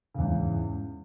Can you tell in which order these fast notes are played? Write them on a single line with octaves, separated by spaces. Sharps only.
C#3 E2 G#2